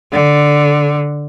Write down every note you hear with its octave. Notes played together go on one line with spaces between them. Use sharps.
D3